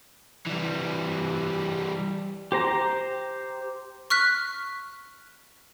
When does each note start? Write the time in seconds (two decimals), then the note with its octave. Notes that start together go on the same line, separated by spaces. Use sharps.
0.47 E3 G3
2.52 G4 C5 A#5
4.10 C#6 F6 F#6 B6